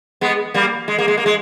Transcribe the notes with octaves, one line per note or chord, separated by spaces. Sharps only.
G#3 B3
G3 A#3
G#3
A#3
G#3
A#3
G#3